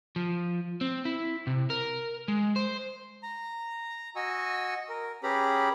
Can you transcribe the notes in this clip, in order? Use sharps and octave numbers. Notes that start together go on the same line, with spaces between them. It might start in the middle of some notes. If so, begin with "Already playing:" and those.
F3
C4
E4
C3
A#4
G#3
C5
A#5
F#4 D#5 G#5 C#6 E6
A#4
C#4 G4 G#4 B4 A#5 B5